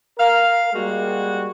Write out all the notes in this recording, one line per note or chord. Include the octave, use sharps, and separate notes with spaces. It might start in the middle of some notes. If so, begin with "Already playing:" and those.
A#4 F5
G3 G#3 A#3 F#4